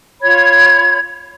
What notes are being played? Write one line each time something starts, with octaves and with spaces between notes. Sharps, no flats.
F4 C#5 B5 G#6